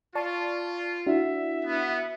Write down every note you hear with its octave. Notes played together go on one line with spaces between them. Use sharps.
F4 D5 A5 C#6
D4 E4 F#4 E5
B3